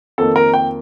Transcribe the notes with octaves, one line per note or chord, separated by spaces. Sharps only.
F2 D#3 A#3 A4
A#4
G5